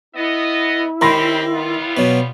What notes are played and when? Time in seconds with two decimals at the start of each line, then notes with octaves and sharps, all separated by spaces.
0.15 B3 E4 D#5
1.01 D#3 C4 C#4 G4 B5 C6 A#6
1.52 G3 B3 F4
1.97 B2 F#3